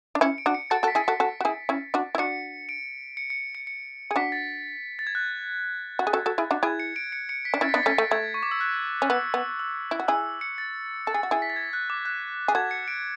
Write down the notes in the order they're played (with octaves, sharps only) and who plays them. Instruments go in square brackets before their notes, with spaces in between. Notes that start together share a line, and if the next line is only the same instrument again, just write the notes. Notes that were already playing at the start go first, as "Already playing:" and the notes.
[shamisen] D4
[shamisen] C#4 E4 [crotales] C#7
[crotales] D7
[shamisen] D4 F#4
[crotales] C#7
[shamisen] F#4 A4 [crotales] A6
[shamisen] F#4 A4
[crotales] B6
[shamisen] E4 G#4
[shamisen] F#4 A4 [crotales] B6
[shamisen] F#4 A4
F#4
E4 G#4
C#4 E4
D4 F#4
E4
[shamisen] D4 F#4 [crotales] C#7
[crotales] D7
C#7
C#7
C#7
C#7
[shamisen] G#4
[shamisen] D4 F#4 [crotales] B6
[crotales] A6
A6
G#6
F#6
[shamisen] F#4
G#4
F#4 A4
F#4 A4
E4 G#4
D4 F#4
[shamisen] E4 G#4 [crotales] G#6
[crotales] C#7
D7
C#7
C#7
B6
[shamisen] D4
[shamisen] C#4 E4 [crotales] A6
[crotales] B6
[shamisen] B3 D4 [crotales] A6
[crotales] B6
[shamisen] A3 C#4
[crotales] A6
[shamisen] A3
[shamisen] A3 [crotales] G#6
[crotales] C#6
D6
E6
F#6
[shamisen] C#4
[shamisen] B3 [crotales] E6
[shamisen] B3
[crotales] E6
[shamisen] E4
F#4
[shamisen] E4 G#4 [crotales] E6
[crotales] C#7
A6
[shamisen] A4 [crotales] A6
[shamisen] G#4
F#4
E4 G#4
[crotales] B6
A6
G#6
F#6
D6
F#6
[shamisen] G#4
[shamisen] F#4 A4 [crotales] G#6
[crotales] C#7
D7